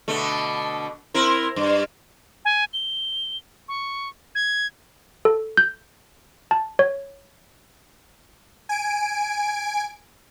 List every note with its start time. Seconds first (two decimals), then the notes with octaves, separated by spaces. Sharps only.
0.08 B2 D3 A3
1.14 C4 E4 A#4
1.56 G2
2.45 G#5
2.73 G7
3.68 C#6
4.35 G#6
5.25 A4
5.57 G6
6.51 A5
6.79 C#5
8.69 G#5 D7